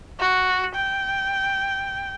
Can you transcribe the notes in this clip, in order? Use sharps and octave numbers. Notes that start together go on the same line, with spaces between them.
F#4
G5